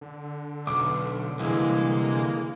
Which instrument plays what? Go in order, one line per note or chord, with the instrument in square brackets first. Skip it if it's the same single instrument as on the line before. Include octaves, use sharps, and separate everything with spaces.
[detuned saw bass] D3
[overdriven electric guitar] B1 [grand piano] D6
[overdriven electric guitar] C2 [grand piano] E3 [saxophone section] G#3 A#3